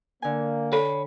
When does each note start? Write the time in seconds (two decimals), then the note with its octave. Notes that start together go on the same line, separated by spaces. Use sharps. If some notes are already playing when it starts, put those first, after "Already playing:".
0.22 D3 A#3 G#5
0.73 A4 C#5 B5